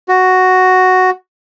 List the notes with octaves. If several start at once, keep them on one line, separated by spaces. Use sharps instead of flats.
F#4